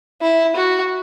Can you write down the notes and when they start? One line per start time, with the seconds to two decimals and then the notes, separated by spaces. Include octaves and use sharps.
0.21 E4
0.56 F#4